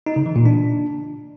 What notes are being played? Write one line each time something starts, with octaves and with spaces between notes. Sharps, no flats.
D#4
C#3
E3
A#2
D4